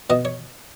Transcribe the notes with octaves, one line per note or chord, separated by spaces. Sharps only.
B2 D#5
C#5